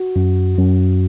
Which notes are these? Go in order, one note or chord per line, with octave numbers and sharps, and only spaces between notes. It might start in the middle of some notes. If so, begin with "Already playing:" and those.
Already playing: F#4
F#2
F#2